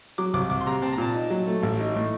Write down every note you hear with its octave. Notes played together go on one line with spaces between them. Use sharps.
F#3 D6
C2 D6
C2 D6
C6
C3 A#5
C4 A5
A#5
A#2 A5
D#4
F#3
A3
A1
D#4
A2